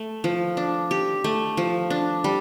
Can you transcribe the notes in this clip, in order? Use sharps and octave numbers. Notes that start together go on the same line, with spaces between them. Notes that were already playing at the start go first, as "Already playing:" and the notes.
Already playing: A3
F3
D4
G4
A3
F3
D4
G3